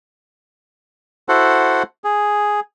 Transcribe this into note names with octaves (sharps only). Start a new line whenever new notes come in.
E4 F#4 A4 C5 F#5
G#4